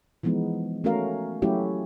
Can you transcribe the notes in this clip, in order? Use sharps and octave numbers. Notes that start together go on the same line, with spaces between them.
E3 F3 G#3 B3 D#4
A3 C#4 F#4 A#4 F5
F#3 A3 C#4 E4 F#4 G4